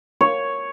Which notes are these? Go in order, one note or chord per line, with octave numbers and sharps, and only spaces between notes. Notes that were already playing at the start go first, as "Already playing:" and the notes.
C#5